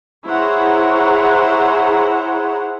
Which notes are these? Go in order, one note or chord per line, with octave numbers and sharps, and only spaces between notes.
E4 G#4 C5 C#5 F#5 A#5